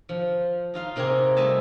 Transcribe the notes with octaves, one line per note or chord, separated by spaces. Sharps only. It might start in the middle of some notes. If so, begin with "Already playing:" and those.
F3
D#4 F4 F5
C3 A#3 C4 D#4 G#4
G3 A3 D#5 E5 A5